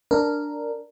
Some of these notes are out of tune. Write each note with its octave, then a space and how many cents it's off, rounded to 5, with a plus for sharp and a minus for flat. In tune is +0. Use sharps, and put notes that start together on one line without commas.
D4 +0 A#4 -5